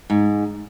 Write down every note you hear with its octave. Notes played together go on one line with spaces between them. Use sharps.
G#2